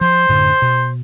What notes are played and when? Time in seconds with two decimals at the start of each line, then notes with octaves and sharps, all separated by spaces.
0.01 F3 C5
0.29 F#2 A2 D3
0.62 B2